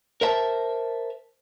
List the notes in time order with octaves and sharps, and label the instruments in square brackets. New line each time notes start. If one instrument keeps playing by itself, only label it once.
[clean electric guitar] A#4 C5 E5 A5